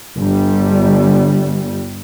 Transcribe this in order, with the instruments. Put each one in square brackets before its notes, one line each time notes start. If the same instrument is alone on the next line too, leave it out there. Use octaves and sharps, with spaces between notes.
[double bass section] G1 G3